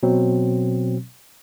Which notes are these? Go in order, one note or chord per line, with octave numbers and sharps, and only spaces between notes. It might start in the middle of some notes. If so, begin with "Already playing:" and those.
B2 F#3 C4